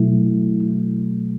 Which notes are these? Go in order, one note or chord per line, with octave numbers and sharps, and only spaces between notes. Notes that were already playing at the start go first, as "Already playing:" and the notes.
Already playing: B2 F#3 A3 E4